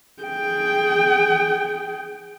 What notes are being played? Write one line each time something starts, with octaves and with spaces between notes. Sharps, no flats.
G#4 G5